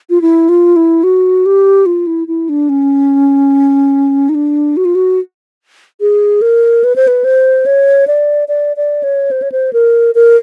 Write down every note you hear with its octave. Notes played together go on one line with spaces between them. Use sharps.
F4
E4
F4
E4
F#4
G4
F4
E4
E4
D4
C#4
D#4
D4
F#4
F4
F#4
G#4
A#4
B4
C5
B4
C5
C#5
D5
D5
D5
C#5
C5
C#5
C5
A#4
A#4